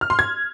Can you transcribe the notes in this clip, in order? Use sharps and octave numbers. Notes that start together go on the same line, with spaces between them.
F6
C6
G#6